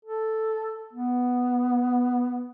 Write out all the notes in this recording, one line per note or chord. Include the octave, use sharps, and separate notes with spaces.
A4
B3